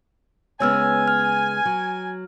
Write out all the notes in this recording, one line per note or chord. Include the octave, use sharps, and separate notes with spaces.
C#3 G#3 B3 C#5 G#5 E6 F6
F6
F#3